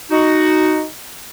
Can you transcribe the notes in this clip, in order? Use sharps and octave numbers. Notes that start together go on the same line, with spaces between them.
D#4 F#4